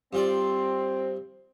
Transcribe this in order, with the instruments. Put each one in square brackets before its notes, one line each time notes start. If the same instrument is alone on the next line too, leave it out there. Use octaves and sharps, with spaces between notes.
[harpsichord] G2 F4 D5 [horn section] C4